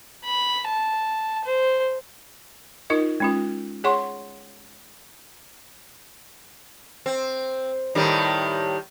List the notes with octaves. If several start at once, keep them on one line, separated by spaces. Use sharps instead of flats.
B5
A5
C5
D#4 F4 A#4 D#5
G#3 C#4 F4
G#4 C#5 F#5 C6 C#6
C4
A2 D#3 G3